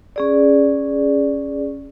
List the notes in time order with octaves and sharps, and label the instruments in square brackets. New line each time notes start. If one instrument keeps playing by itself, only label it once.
[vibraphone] C#4 G#4 D5